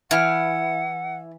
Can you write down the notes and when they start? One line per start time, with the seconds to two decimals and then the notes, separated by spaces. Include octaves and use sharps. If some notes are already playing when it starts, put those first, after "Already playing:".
0.11 E3 E4 F#5 F6